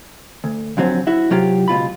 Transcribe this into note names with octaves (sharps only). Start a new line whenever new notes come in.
D2
F2 D3 F#3 C4 C#4
E4 F#4 E5
C3 F#3 F4 G4
C#2 B2 F4 B5